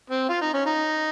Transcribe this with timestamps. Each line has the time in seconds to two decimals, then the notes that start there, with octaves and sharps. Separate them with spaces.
0.10 C4
0.29 F4
0.41 D#4
0.54 C#4
0.66 D#4